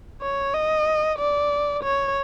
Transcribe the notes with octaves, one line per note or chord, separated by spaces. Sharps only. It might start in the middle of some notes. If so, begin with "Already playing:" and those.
C#5
D#5
D5
C#5